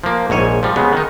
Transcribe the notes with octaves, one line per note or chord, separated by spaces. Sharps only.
F3 A#3
A#1 G#2 C#5 G#5
F3 G3
C#3 G#3 B3
D#3 D#4